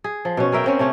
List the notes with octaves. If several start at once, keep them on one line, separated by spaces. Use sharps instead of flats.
G#4
F3
B2 C#4
G#4 A#4 E5 G5
A#3 C4 C#4
C3 A3 C#4